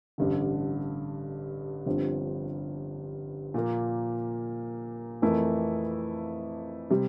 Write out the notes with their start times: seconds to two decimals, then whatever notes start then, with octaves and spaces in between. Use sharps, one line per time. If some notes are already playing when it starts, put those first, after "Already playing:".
0.18 A1 G2 D3
1.86 G1 G2 F3 C4
3.54 A#2 F3 A#3
5.22 F2 E3 A3 E4 A#4
6.90 C3 G3